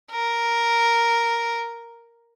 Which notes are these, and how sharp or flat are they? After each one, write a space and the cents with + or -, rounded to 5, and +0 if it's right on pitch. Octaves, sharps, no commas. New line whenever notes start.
A#4 +0